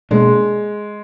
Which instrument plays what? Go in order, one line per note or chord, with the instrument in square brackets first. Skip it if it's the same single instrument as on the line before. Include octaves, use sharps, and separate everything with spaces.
[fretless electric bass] B2 A#3 D4 [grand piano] G#3